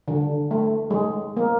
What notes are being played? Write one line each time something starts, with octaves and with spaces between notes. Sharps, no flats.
D3
A3
G#3
A#3